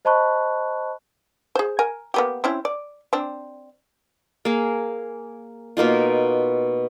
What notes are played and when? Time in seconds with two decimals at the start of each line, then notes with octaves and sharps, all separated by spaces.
0.05 C5 D#5 A5 B5 C#6 F#6
1.55 G#4 C5
1.79 A#4 G#5
2.14 A#3 B3 G4
2.44 C4 C#4 E4
2.65 D5
3.13 C4 D4
4.45 A#3 G#4
5.77 B2 A#3 D#4 F4